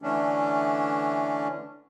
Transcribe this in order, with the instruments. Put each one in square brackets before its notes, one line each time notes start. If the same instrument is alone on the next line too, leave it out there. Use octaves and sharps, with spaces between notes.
[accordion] D3 E3 A3 C#4 D4